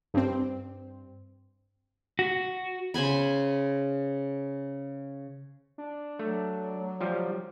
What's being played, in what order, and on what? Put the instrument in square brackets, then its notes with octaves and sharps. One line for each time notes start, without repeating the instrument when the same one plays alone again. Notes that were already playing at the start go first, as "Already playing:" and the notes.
[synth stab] G2 C4
[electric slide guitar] F#4
[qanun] C#3 C5 G#5 B5
[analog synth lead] D4
[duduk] F#3 [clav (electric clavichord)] A3
[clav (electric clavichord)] F3 G3